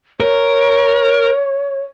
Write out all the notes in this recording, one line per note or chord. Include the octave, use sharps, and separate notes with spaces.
A#4 C#5